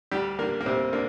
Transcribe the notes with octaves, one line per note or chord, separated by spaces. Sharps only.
D2 G3 G4
D3 G3 A#3 A#4
A#3
D2 C3 C4
D3 A#3